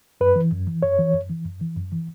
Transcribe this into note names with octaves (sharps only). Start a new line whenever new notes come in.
F#2 B4
E3
F#2
E3
F#2 C#5
E3
F#2
E3
F#2
E3
F#2
E3